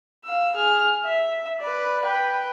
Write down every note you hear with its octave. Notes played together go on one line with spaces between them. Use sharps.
F5 E6
G#4 F6
E5
B4 D5
B4 G5